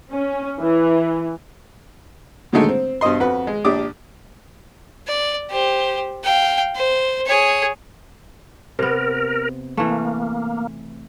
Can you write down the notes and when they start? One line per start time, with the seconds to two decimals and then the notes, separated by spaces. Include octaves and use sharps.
0.11 C#4
0.60 E3
2.53 A#2 D3 D#3 F#3 G#3 A3
2.69 C4
3.01 G2 B2 C5 D#5 C6
3.20 F2 F#4 B4
3.47 G#3
3.65 A#1 D4 G4 D6 D#6
5.07 D5
5.50 G4 C5
6.24 F5 G5
6.75 C5
7.26 G#4 C#5
8.79 C3 B3 A#4
9.77 E3 A3 A#3